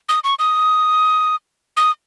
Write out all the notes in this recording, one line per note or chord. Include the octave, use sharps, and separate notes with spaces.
D#6
C#6
D#6
D#6